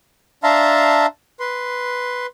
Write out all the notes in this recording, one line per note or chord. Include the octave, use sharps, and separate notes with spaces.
D4 E5 F5 A5 A#5 C6
B4 C6